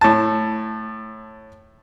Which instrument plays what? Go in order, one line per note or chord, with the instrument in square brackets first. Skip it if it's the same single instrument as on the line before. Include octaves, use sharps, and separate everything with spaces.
[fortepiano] A2 A5